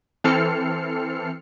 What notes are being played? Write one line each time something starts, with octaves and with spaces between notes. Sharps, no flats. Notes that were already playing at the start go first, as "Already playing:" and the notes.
E3 C4 A4 F6 C7 C#7